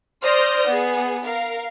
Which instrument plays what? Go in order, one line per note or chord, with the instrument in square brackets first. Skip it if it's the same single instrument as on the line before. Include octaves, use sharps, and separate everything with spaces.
[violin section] C5 D5 D#6 F6 G6 A#6
B3 G#4
A#4 F5